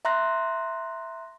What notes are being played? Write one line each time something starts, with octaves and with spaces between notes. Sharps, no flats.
E5 A#5 C6 F#6 A#6